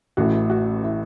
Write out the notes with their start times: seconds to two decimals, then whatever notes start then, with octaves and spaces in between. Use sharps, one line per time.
0.17 A1 A2 E3 F#4
0.50 F#4
0.83 E4